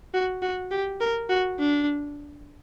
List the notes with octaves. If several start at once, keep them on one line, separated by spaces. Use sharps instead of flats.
F#4
F#4
G4
A#4
F#4
D4